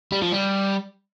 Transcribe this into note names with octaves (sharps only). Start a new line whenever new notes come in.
G3
F3
G3